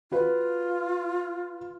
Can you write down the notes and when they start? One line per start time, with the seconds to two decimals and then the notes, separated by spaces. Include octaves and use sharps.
0.12 F4 F#4 B4 F5